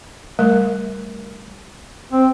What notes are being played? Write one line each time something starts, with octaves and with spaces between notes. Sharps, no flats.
G3 A3 A#4
C4